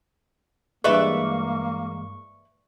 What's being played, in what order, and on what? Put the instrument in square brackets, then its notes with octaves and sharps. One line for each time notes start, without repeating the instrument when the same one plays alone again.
[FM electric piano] G2 E3 G#3 [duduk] A#3 [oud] B4 D5 E5 [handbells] C#6